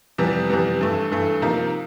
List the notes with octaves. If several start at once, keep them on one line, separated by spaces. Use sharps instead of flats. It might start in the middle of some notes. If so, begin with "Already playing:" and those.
F2 C3 E3 G3 B3
F2 C3 E3 G3 B3
G2 E3 A3
G2 E3 A3
C3 F3 A#3 D#4